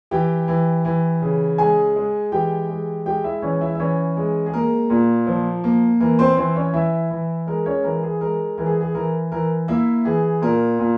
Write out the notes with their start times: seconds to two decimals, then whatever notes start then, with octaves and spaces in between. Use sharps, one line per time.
0.11 E3 G4 G5
0.48 E3
0.85 E3
1.22 C#3
1.58 G#3 G#4 G#5
1.96 G#3
2.32 E3 G4 G5
2.69 G#3
3.06 G#3 G4 G5
3.24 E4 E5
3.42 E3 C#4 C#5
3.61 E4 E5
3.75 E5
3.79 E3 C#4 C#5
4.17 G#3
4.46 G#4
4.53 A#3 A#4
4.90 A#2
5.27 F3
5.64 A#3
6.00 E3 A#4
6.19 C4 C5
6.37 E3 C4 C5
6.56 C#4 C#5
6.74 E3 E4 E5
7.10 E3
7.47 G#3 A#4
7.66 C#4 C#5
7.84 E3 A#4
8.03 G#4
8.21 G#3 A#4
8.58 E3 A#4
8.66 G#4
8.81 G#4
8.95 E3 A#4
9.32 E3 A#4
9.68 A#3 E4 E5
10.05 E3 G#4
10.42 A#2 A#4
10.79 A#2